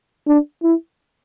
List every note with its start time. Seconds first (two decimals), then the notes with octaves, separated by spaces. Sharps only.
0.27 D4
0.63 E4